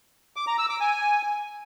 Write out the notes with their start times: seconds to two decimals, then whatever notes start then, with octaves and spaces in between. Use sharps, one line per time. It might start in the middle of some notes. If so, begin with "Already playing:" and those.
0.36 D6
0.47 A#5
0.58 E6
0.69 D6
0.81 G#5